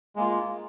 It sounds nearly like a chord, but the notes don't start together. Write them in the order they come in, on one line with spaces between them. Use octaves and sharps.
G#3 A#3 F4